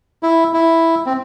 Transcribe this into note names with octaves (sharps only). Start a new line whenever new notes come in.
E4
E4
C4